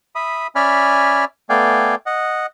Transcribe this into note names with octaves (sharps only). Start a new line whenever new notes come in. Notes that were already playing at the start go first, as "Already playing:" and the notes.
E5 B5 D#6
C#4 D5 E5 G#5 B5 F6
A3 B3 D5 F5 G5 G#5
D#5 F#5